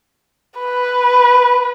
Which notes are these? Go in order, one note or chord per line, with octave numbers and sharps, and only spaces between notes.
B4